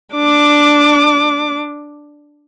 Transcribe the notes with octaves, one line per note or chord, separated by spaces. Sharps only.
D4 D6